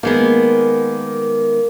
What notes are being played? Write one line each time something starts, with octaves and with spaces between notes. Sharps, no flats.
D#3 G#3 A#3 B3